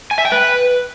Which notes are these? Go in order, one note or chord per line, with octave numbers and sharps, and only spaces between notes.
G#5
E5
G5
B4